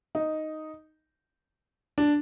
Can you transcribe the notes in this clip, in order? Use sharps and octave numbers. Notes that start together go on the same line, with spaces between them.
D#4
D4